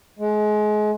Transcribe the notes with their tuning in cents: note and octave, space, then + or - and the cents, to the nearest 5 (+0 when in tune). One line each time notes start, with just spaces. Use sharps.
G#3 +30